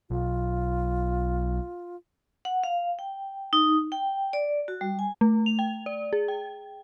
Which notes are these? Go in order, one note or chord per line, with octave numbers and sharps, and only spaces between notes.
B1 F4
F#5
F5
G5
D#4
G5
D5
F#4
G3
G#5
A3
F7
G5
D5
G#4
G5